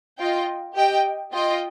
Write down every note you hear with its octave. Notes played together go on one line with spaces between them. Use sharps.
F4 D#5 G5
G4 D#5 G5
F4 D#5 G5